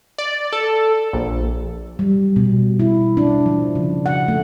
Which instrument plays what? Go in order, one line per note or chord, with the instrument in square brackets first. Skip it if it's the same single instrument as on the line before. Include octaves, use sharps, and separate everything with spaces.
[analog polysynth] D5
A4
A#1
[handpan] G3
B2
E4
D4
F3
C#3
F#5
A3